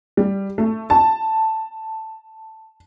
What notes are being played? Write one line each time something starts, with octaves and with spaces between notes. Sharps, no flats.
G3
A3
A5